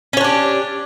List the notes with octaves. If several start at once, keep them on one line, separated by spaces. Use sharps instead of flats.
C#4 D4 G4 C#5